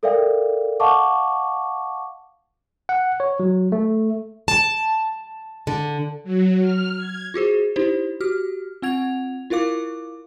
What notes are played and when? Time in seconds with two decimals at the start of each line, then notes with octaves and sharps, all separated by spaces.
0.03 A4 A#4 D5 E5 F5 G5
0.80 D#5 F5 F#5 A5 C#6 D6
2.89 F#5
3.20 C#5
3.40 F#3
3.72 A3
4.48 A5
5.67 D3
6.24 F#3
6.61 F6
6.96 G#6
7.34 F4 F#4 G#4 C5
7.76 D#4 E4 G4 C5
8.20 F#4 G4 F6
8.82 C4 F4 F#5 G#6 F7
9.50 E4 F4 A#4 F5 D6